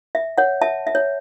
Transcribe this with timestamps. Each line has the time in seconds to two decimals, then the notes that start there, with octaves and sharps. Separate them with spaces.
0.15 E5
0.38 C#5 F#5
0.62 E5 A5
0.87 E5
0.95 C#5